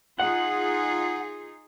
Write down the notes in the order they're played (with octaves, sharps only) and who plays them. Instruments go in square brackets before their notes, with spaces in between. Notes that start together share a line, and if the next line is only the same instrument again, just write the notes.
[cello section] D#4 F4 G#4 [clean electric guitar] F#5